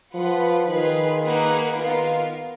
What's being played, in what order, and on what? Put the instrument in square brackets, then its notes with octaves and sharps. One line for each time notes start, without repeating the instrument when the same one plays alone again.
[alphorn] F3 [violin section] F4 B4 F#5
[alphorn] D#3 [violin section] F4 G#4 B4
[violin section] A#3 D#4 G#4 B4 F#5
[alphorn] D#3 [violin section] B3 F4 A#4 F5